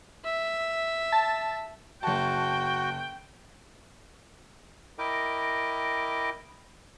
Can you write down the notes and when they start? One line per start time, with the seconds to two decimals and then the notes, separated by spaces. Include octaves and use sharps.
0.24 E5
1.12 A5
2.03 F#1 F#4 G5 A5
4.99 E4 A#4 D#5 G5 D6